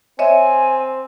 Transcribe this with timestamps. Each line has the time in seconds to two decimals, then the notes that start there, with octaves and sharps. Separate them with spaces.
0.19 C4 C#5 D#5 E5 G#5